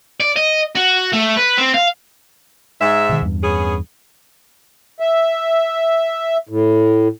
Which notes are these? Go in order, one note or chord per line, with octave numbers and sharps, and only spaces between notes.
D5
D#5
F#4
A3
B4
C4
F5
G#2 E5
B2 D#3
E2 G2
B3 C#4 G#4
E5
A2